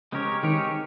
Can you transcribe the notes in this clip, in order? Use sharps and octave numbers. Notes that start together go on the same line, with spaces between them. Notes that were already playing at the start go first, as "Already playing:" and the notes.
C#3 G#3 C4 G4 A#4 C#5
D#3 G#3 C4 G4 A#4 C#5